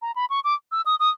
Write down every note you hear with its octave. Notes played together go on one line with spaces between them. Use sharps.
A#5
B5
C#6
D6
E6
D#6
D#6